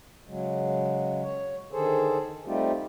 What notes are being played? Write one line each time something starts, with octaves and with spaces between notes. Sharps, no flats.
C#3 F#3 G#3
C#5
D3 D#3 G#4 A4 C5
G3 A3 C4 D#4 F4 G4